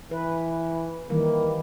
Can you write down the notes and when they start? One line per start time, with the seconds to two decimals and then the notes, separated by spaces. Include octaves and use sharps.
0.11 E3 B4
1.10 D#3 E3 G3 A#3